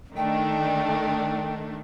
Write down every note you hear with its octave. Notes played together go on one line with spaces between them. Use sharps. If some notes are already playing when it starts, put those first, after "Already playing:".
D#3 A3 D4 G5